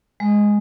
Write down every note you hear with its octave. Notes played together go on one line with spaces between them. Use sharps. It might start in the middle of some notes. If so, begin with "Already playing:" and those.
G#3